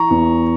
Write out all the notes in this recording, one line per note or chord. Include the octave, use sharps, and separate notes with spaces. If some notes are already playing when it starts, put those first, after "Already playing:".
Already playing: E3 A#5 C#6
E2